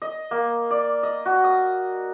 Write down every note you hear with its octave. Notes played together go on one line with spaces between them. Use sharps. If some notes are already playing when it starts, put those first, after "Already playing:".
D#5
A#3
D5
D#5
F#4
D#6